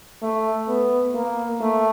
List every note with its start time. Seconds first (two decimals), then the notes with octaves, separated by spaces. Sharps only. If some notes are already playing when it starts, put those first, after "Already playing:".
0.22 A3
0.68 B3
1.15 A#3
1.61 A3